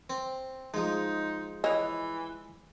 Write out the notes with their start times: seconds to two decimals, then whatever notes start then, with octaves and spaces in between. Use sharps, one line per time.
0.10 C4
0.74 F3 G#3 D#4
1.64 E3 C#5 D#5